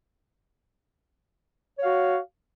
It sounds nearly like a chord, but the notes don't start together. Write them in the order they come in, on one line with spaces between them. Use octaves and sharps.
C#5 F5 F#4